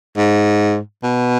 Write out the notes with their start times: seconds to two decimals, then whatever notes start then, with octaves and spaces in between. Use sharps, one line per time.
0.17 G#2
1.03 B2